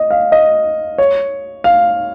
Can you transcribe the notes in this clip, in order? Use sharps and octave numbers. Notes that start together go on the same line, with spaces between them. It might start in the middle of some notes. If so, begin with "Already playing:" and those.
Already playing: D#5
F5
D#5
C#5
F5